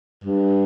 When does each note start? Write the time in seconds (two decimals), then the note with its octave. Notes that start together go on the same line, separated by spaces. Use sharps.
0.24 G2